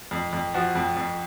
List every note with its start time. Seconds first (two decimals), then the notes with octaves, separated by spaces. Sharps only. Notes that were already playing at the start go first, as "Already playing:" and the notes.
0.11 F2
0.33 F2
0.54 F3 F#4
0.75 F2
0.97 F2